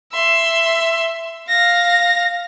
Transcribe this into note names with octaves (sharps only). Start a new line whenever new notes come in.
E5 C6
F5 A#6